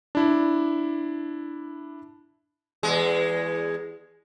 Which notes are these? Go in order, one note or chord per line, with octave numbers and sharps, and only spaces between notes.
D4 E4
E2 G#3